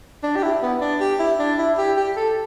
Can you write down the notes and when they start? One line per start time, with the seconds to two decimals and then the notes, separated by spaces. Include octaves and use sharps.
0.24 D4
0.36 G4
0.43 E4
0.62 B3
0.82 D4
1.01 G4
1.20 E4
1.39 D4
1.59 E4
1.78 G4
1.97 G4
2.16 A4